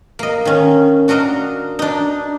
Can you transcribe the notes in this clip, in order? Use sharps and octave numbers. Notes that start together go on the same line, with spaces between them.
A#3 D#5
D#3 C#4
D4 F#4 A#4 D#5 F5 A#5
D4 D#4